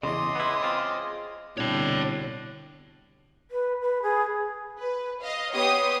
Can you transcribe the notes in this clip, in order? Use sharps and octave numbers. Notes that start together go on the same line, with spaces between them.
E2 A2 C#3 G#4 D#5 C6 D6
B3 E4
C4 F4
C2 B2 D3 D4 C#5 G5
B4
B4
G#4
B4
D#5 F5
B3 G4 C#5 C6 D#6